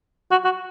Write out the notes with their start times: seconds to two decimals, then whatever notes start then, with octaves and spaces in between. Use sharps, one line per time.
0.31 F#4
0.44 F#4